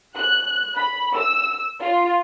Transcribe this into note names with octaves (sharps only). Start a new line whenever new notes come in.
F#6
B5
E6
F4